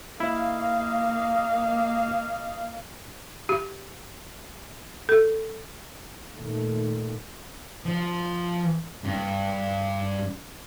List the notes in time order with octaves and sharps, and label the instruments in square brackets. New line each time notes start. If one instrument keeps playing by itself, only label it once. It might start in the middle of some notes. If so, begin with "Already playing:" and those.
[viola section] A#3 F5 [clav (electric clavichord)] E4 [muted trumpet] D#5
[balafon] G4
A4
[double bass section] A#2 D#3 A3
[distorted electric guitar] F3
G2